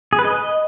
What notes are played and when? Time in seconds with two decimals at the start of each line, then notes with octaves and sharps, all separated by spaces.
0.13 G#4
0.19 B4
0.25 D#5